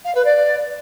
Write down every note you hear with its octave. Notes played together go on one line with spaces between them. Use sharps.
F5
B4
D5